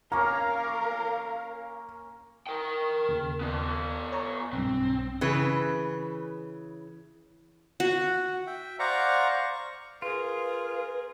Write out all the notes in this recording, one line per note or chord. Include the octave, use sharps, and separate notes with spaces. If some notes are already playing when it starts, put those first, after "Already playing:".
A#3 C#4 A#4 C#5 F5 A#5
A#4 G5
D#2 C#3
B3 F4
C#5 A#5
B1 G2 C4
C#3 E3 B4
F#4
E5 G5
C5 D5 F5 F#5 A#5 C#6
C#6
F4 G#4 A#4 B4